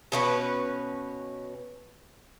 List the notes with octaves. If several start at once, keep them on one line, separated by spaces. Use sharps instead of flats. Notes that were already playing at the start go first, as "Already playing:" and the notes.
B2 C#4 F#4 B4